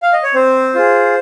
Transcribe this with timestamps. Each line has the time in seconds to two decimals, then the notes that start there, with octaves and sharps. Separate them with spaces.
0.03 F5
0.13 D#5
0.24 C#5
0.34 C4 C5
0.75 F4 G#4